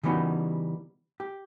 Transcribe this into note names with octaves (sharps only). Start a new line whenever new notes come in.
C#3 E3 G3 B3 D#4 F#4
G4